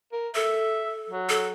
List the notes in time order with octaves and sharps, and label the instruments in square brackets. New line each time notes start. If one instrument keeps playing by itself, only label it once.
[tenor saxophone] A#4
[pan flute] A4 [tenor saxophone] E5
[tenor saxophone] F#3
[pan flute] A4